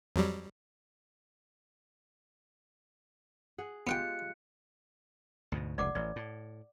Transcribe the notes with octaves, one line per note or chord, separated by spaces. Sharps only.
F2 F#3 G3
G#4 F#5
G#3 B3 F4 G4 F#5 G5 F#6 C#7
D2 G#2 B2
F1 C#2 D5 F#5 D6
A1 D5
A2